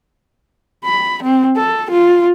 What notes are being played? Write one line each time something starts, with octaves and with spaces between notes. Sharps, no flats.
B5
C4
A4
F4